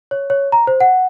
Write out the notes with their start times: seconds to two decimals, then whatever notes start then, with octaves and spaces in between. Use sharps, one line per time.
0.11 C#5
0.30 C#5
0.52 A#5
0.67 C5
0.80 F#5